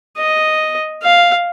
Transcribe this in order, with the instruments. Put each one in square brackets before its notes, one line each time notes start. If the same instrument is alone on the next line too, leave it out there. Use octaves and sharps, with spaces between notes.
[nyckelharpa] D#5
F5